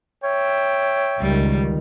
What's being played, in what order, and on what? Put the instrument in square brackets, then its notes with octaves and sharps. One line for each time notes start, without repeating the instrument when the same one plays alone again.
[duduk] C#5 [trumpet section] E5 G5
[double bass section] C#2 D#3 [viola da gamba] G3